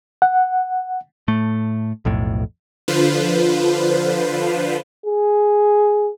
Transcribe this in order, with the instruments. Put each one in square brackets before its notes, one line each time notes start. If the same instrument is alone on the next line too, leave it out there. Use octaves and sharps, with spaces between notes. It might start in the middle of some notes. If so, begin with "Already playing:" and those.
[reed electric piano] F#5
[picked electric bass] A2 A3
B1 F2 A2
[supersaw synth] D3 F3 F4 B4 C5
[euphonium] G#4